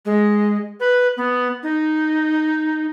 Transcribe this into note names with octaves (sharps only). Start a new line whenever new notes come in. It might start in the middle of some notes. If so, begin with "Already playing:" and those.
G#3
B4
B3
D#4